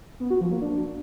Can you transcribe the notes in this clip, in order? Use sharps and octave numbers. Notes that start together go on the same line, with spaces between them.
B3
F#4
F3
A#3
D4